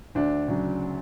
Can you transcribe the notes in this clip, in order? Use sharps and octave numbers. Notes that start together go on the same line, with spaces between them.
D2 D4
C#3 F#3